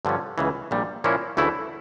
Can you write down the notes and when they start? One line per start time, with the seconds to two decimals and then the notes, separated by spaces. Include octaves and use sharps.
0.05 G2 D3 F3 C#4
0.38 C#2 C#3 E3
0.71 A#1 A#2 G3
1.04 A#2 F3 A#3 C#4 E4
1.37 D2 C#3 E3 A3 E4